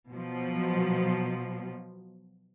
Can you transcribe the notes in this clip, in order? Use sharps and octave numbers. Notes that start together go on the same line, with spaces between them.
B2 F3 F#3